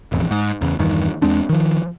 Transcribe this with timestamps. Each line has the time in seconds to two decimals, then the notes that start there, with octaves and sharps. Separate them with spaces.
0.12 E1 A1 F2
0.31 G#2
0.62 E2 C#3
0.79 E2 G2 D#3
1.22 E2 G#3 C4 D4
1.49 D#3 F3